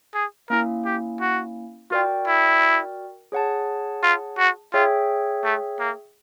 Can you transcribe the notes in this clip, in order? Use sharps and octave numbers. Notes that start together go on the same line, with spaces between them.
G#4
A#3 C#4 E4 A#4
G4
F#4
F4 F#4 A#4 D5 G5
E4
G#4 C#5 F#5 A5
F4
F#4
F4 G#4 C#5 E5 G5
A3
A#3